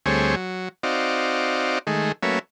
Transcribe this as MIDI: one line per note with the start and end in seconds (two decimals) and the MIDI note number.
0.06 0.35 38
0.06 0.35 55
0.06 0.35 57
0.06 0.35 60
0.06 0.35 68
0.06 0.35 73
0.36 0.69 54
0.83 1.79 60
0.83 1.79 63
0.83 1.79 66
0.83 1.79 74
0.83 1.79 77
1.87 2.12 51
1.87 2.12 56
1.87 2.12 57
2.23 2.39 54
2.23 2.39 57
2.23 2.39 58
2.23 2.39 61
2.23 2.39 71
2.23 2.39 76